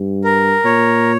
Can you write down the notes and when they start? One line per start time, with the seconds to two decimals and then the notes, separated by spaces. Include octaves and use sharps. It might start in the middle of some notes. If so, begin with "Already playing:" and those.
Already playing: G2
0.24 A#4
0.65 A#2 C#5